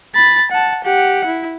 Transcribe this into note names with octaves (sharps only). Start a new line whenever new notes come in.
B5 A6
F#5 A5
G4 F#5
E4